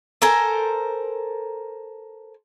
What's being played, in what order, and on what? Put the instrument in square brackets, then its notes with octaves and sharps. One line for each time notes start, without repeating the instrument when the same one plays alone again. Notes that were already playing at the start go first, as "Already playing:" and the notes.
[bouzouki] A4 A#4 C5 G#5